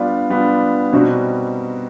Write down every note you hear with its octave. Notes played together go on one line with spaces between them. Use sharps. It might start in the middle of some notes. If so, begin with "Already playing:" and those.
Already playing: G3 B3 D4 F4
G3 B3 D4 F4
B2 G3 C4 D#4 F#4